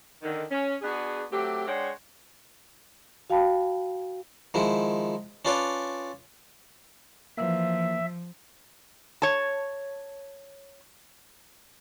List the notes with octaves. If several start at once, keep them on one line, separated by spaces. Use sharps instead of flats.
D3 D#3
C#4
B3 D4 F#4 G#4
F#3 A3 C4 G4
G#3 D4 C5 C#5 F#5 G5
F#4 F5 G5 A5 B5
D#3 F3 G#3 E4
C#4 D4 F4 B4 C#5 D5
E3 F3 A#3 E5
C#5 A5